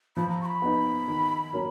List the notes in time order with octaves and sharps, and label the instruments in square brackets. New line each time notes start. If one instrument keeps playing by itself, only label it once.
[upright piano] F3 [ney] B5
[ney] A#5
C#6
B5
[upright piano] B3 D#4
D#3
F#3 A#3 C#4